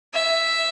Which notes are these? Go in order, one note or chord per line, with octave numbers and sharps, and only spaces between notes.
E5